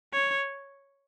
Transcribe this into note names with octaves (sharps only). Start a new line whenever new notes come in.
C#5